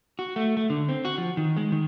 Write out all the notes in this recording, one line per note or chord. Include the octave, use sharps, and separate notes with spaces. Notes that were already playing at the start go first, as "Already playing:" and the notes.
F#4
A3
A3
D3
C4
F#4
F3
D#3
G#3
D#3